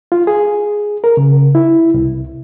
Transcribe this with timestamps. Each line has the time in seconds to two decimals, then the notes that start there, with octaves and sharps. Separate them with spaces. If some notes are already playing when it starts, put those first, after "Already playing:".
0.12 F4
0.27 G#4
1.04 A#4
1.17 C#3
1.55 E4
1.94 C2